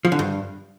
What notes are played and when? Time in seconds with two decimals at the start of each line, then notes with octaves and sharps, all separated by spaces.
0.05 F3
0.12 D3
0.19 G2